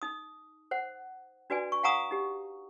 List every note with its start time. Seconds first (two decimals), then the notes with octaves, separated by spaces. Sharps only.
0.02 D#4 D#6
0.71 C5 F#5
1.50 D4 F#4 B4 D5 G#5
1.72 C#6
1.83 F5 F#5 G#5 A#5 C#6 D#6
2.11 D#4 G4